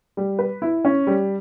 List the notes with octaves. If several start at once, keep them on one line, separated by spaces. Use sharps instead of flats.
G3
B4
E4
C#4
G3